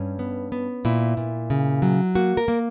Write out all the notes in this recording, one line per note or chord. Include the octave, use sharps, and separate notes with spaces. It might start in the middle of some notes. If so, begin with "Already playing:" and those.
Already playing: G2 C#4
B3
B3
A#2 E4
A#2
C#3
F#3
A#3 F#4
A#4
A#3